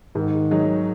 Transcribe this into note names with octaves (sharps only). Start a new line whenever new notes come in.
G#2 D#3
F#3 D#4 G#4